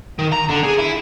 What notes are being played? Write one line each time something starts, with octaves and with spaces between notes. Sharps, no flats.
D#3
A#5
D3
G#4
E4